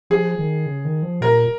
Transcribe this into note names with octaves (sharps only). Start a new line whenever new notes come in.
F3 G#4
D#3
C#3
D#3
F3
A#2 A#4